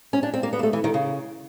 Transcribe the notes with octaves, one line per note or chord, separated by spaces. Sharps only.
C#4
D4
C4
A#3
B3
A#3
A3
E3
D#3
C#3